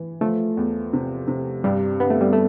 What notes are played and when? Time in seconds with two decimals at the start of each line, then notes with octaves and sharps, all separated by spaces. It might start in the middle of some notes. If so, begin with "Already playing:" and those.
Already playing: E3
0.21 F3 A3
0.57 E2
0.93 C3
1.28 C3
1.64 G2 G3
1.99 D3 B3
2.10 A3
2.21 G3
2.33 A3